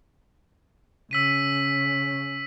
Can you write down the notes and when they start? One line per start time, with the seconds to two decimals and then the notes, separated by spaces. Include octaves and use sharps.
1.11 C#3 E6 B6 D#7